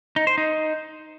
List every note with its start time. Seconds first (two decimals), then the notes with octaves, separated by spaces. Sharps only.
0.16 D#4
0.27 C5
0.38 D#4